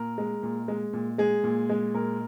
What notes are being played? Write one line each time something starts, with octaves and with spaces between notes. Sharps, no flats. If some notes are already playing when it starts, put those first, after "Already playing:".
Already playing: A#2 A#4
G#3
A#2
G#3
A#2
G#3 G#4
A#2
G#3
A#2 A#4